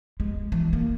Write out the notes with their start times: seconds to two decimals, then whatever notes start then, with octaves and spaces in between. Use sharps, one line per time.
0.20 G#3
0.52 E3
0.73 A#3